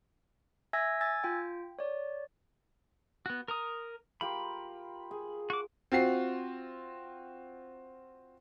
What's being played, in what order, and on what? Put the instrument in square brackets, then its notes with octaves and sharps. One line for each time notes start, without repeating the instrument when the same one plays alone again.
[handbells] E5 G#5 E6 G#6 A#6
G#5 E6 G#6 A6
F4 G5
C#5 D5
[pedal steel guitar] B3 F#4
A#4 A#5 D#6
[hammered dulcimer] F4 G4 A#4 [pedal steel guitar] B5
[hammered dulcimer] G#4
[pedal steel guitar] F#4 D6
[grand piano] C4 F4 F#4 C7